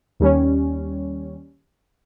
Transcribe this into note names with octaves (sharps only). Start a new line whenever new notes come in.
D#2 G3 C#4